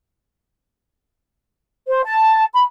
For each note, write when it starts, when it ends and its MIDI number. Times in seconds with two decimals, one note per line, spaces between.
1.88 2.01 72
2.05 2.45 81
2.54 2.63 83